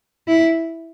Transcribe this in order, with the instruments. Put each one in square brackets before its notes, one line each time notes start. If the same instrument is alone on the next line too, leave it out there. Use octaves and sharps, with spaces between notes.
[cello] E4